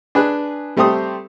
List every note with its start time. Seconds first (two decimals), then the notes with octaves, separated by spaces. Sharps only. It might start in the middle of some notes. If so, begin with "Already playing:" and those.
0.15 D4 G#4 B4
0.77 G3 A3 C4 G4 D#6